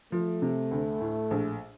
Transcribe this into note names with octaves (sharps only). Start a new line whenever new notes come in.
F3 A3
C3
D2
A2
A#1